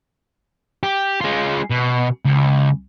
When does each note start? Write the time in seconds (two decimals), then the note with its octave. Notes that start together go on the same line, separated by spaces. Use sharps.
0.83 G4
1.21 G#3 F4
1.70 B2
2.25 C#2